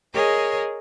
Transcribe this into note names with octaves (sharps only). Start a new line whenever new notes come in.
G#4 A#4 C#5 D#5